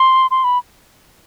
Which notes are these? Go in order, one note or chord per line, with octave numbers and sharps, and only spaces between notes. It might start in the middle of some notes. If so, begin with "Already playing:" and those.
Already playing: C6
C6
B5